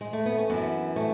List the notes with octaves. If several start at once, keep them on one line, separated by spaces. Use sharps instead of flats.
G#3
A3
B3
C#4
F#2 E3 B3 D4
A3 C#4